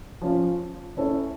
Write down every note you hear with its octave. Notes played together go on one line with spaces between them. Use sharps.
F3 C#4 F4
C#4 E4 A4 C#5 E5